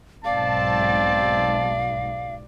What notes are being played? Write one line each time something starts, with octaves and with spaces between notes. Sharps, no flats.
B1 G#2 C4 D5 F5 A5